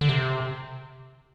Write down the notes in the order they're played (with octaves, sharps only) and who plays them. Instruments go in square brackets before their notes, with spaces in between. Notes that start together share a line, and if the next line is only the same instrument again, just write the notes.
[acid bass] D3
C3